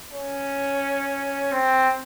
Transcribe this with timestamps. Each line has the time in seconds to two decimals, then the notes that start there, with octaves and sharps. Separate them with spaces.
0.13 C#4
1.52 C4